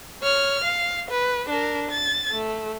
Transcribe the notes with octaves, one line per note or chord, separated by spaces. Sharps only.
C#5 F6
F5
B4
D4 A#4
A6
A3